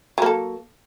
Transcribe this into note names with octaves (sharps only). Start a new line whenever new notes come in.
F#3 A#3 A4